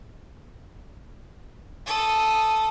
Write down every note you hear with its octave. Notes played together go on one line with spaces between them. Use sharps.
A4 D#6